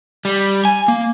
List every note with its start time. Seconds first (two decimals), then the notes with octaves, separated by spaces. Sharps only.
0.25 G3
0.65 G#5
0.88 A#3